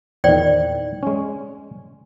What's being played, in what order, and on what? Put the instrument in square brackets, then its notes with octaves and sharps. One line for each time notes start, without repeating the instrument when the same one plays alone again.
[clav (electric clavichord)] E2 A#2 D#3 [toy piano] C5 D5 G5
[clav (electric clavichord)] G#3 C#4